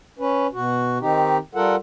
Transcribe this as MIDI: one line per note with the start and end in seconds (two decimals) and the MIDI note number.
0.19 0.47 61
0.19 0.47 71
0.53 0.98 47
0.53 0.98 66
1.01 1.38 51
1.01 1.38 60
1.01 1.38 63
1.01 1.38 67
1.55 1.76 55
1.55 1.76 65
1.55 1.76 69
1.55 1.76 70
1.55 1.76 78